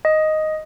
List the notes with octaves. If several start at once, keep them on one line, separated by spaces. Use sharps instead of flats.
D#5